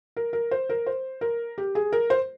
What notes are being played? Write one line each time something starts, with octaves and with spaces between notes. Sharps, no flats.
A#4
A#4
C5
A#4
C5
A#4
G4
G#4
A#4
C5